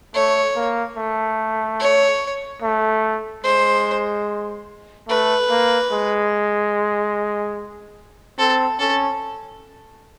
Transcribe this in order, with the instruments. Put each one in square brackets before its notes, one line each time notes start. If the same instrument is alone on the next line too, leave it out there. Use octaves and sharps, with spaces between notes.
[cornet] A3 [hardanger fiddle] C#5
[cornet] A#3
A3
[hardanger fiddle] C#5
[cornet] A3
[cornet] G#3 [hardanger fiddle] C5
[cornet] A3 [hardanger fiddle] B4
[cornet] A#3
G#3
[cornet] C4 [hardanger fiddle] A4
[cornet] C#4 [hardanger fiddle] A4